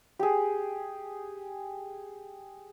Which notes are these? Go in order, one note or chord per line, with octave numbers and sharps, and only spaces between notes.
G4 G#4